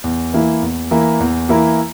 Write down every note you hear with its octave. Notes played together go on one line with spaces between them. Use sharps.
E2
E3 A#3 E4 A#4
E2
E3 A#3 E4 A#4
E2
E3 A#3 E4 A#4